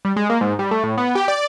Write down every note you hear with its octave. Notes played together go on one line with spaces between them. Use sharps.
G3
G#3
A#3
G#2
G3
A3
A2
B3
G4
D5